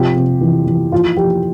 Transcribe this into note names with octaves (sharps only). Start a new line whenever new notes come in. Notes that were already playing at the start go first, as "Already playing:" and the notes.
Already playing: C3 F3 G4
C3
E3
E3
F3 F4
F3 G4